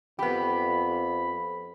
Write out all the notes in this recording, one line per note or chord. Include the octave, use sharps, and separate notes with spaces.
F2 B3 G4 B5